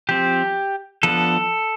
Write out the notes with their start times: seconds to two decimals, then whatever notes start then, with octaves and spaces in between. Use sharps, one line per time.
0.09 F3 C4 G4
1.03 F3 B3 D4 A4